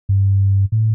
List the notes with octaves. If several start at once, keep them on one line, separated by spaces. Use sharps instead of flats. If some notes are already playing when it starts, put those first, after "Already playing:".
G2
A2